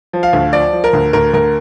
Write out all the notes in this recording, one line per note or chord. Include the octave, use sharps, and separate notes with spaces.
F3
F5
D2
F3 D5
F3
A#4
D2
D2 A#4
D2 A#4